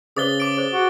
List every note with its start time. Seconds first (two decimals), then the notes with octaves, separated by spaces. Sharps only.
0.17 C#3 G#4 B4 C5 D#6 A6 G7
0.40 D6 D7
0.57 G#4 C5
0.73 F#4